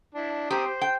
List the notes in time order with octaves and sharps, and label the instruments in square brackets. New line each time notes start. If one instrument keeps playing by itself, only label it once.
[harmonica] D4 E4
[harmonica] C4 A#5 D#6 [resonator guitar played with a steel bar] G4
[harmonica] C5
[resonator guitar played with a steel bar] G5